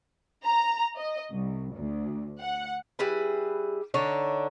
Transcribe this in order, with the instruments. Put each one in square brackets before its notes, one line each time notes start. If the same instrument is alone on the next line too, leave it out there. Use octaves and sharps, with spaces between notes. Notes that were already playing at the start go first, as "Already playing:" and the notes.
[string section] A#5
D#5
C2
D2
F#5
[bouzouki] G3 E4 G#4 B4
D3 D4 D#4 C#5